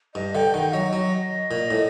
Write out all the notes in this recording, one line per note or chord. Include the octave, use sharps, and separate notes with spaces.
G2 D#5
D3 G5
D#3 F#5
F#3 D#5
F#3 D#5
A#2
A2